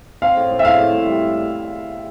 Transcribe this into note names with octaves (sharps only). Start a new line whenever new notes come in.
C4 F5
A2
A2
E5
A2 F5
A2
A2
G3